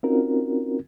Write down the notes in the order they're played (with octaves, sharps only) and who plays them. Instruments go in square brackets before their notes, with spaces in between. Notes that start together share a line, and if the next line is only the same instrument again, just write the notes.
[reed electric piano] C4 C#4 D#4 F4 F#4 A#4